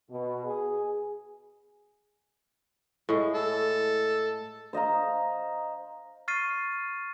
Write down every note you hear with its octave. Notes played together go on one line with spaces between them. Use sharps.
B2
G#4
A2 G#3
A4
C5 D#5 F5 A#5
C#6 F6 A6 C7 D#7